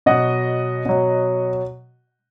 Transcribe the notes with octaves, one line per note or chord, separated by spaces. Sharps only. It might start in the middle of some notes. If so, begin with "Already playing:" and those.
B2 F#3 D#5 F#5
B2 F#3